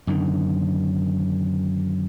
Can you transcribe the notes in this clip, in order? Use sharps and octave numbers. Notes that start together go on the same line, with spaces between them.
F#2 D3 D#3